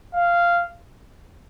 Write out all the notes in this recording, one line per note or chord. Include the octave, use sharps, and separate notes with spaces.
F5